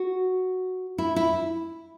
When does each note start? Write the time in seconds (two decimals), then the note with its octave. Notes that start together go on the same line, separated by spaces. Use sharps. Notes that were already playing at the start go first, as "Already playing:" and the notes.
Already playing: F#4
0.98 E4
1.16 E4